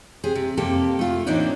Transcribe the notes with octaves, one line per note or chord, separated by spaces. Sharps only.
C3 G4 G#4
C3
F2 C3 A#3 G4 A4
A3 F4
A2 E3 A#3 C4 D4 D#4